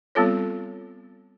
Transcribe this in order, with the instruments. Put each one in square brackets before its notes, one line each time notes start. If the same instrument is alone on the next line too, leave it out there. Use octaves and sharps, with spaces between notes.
[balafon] G3 B3 C4 F4 A4 C#5